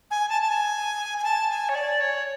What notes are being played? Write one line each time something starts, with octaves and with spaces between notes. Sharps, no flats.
G#5
A5
A5
G#5
G#5
A5
G#5
C#5
D5
C#5